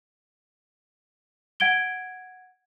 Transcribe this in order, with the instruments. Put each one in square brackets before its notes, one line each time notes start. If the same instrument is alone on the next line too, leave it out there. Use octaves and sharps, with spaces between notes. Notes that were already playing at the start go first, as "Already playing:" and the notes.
[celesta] F#5 G#6 D7 G7